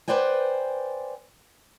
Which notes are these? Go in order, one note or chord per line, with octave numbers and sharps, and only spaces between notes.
B4 C5 D5 G5 G#5